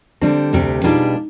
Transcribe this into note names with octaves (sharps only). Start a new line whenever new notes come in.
D3 G3 C4 D4
D2 C3 G3 C4 G4
B2 G3 D4 D#4 F4 G#4